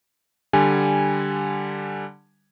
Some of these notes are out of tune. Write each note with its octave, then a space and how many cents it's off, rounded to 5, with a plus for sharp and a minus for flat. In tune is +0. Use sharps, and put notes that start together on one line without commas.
D3 +0 G3 +0 G#5 +0